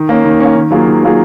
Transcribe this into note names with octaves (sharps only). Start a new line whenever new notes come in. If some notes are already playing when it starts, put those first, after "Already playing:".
Already playing: D#3
A#3 C#4
D#3
A#3 C#4
D#3
F#3 A#3 F4 G#4
D#3
F#3 A#3 F4 G#4